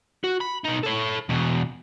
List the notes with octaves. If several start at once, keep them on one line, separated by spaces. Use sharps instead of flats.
F#4
B5
B2 D#4
A4 C#5
E2 B2